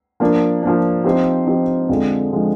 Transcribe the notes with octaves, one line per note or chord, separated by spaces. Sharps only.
F3 A#3 D4
F3 A#3 D4
F3 C4 D#4 G4 C5
F3 C4 D#4 G4 C5
F2 D3 F3 G#3
D3 F3 G#3